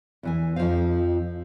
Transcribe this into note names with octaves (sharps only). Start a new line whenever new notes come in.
E2 E3 G#5
F2 F3 C#4 D#4 C5 F5